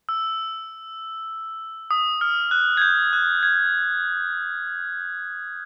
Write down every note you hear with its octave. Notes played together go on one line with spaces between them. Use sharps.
E6
D#6
F6
F#6
G#6
G6
F#6
G#6